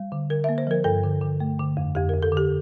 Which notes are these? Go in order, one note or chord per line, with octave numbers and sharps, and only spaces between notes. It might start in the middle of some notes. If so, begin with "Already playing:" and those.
Already playing: G3
D3
D3 A#4
E5
A#3
C5
F3 A#4
G2 A4
D3
D3
A3
D3
F2
F2 G4
A#4
F2
A4
D3
G4